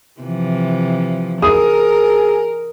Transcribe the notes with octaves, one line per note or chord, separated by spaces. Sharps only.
C3 E3 F3
G#4 A#4 D#6